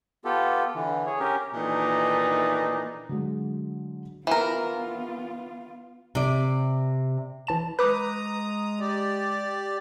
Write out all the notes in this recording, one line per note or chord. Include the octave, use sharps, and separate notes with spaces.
B3 F4 G4 A4
D3 E3
G#4 C#5
C#4 G4 A#4
A#2 D#3 E3 A3 D4 D#4
D3 F#3 G#3
E3 B3 F4 A#4
C3 D5
E3 A5 E7
G#3 B4 A#5 D6 D#6 F#6
G4 D5